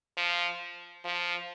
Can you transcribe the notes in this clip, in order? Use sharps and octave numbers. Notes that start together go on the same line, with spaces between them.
F3
F3